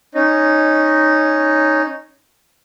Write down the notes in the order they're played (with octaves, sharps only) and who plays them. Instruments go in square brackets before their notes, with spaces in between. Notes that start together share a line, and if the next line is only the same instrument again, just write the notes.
[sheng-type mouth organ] C#4 D#4